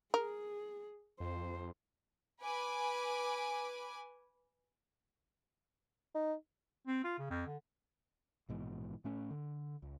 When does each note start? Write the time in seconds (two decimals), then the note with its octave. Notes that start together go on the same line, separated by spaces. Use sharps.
0.14 G#4 A#4
1.20 F2 C5
2.41 B4 G#5 D6
6.15 D#4
6.87 C4
7.04 F4
7.19 C#3
7.30 F2
7.47 D3
8.49 A#1 G#2 B2 E3
9.04 A2 A3 C#4
9.31 D3
9.82 C#2